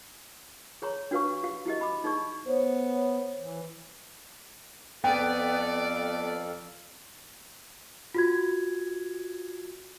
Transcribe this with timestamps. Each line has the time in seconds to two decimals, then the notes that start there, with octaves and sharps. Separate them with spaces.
0.82 G#4 C#5 A#5 C6
1.11 D4 F#4 B4 F5 C#6
1.43 F#4 G4 F5
1.66 E4 F#4 G4 D#5
1.81 B5 D6
2.04 D#4 G#4 D5 C#6
2.46 B3 C5 C#5
2.94 C#5
3.40 E3
5.04 F2 B3 A4 D5 F5 G5
8.15 F4 F#4 G#6